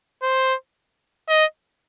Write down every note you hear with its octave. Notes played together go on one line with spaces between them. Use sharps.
C5
D#5